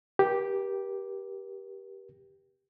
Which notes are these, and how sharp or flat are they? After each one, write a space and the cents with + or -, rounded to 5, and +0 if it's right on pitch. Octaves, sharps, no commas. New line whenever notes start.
G4 +0 A#4 +45